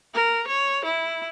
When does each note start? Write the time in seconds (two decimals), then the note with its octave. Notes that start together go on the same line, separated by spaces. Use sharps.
0.14 A#4
0.48 C#5
0.85 E4